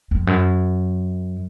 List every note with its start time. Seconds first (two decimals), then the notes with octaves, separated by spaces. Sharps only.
0.11 F2
0.27 F#2